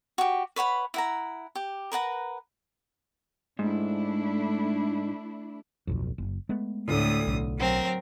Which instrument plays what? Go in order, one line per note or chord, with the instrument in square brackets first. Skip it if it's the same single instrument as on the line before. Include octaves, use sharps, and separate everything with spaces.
[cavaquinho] F#4 G4
B4 C#5 F#5 B5
E4 F#5 A#5
G4
A#4 B4 F#5 A#5
[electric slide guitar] G#2 [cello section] A3 D4 E4
[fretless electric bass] D1 B1 F2
F#1
G#3 A3 B3
[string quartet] D2 A2 D#6
[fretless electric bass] B1
[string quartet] F#3 C4 A#4